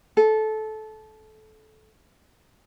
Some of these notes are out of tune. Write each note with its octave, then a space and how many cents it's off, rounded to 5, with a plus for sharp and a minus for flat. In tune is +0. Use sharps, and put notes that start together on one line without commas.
A4 -20